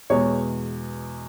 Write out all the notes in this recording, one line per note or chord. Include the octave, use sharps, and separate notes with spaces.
E2 B2 G#3 C#5